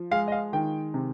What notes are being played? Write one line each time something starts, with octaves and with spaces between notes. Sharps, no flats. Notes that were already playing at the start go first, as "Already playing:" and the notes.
Already playing: F3
G#3 F5
D#5
F5
D#3 G5
C3